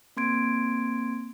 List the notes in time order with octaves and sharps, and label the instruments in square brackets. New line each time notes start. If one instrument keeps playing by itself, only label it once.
[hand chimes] A#3 C4 C6 G#6 D7